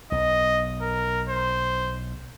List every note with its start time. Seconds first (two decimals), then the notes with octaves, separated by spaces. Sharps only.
0.12 B1 D#5
0.82 A#4
1.29 C5